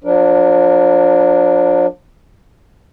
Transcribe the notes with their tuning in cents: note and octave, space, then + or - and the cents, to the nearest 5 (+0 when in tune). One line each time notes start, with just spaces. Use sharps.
F3 +35 D4 +0 A#4 +0